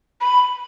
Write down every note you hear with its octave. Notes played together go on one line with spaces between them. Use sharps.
B5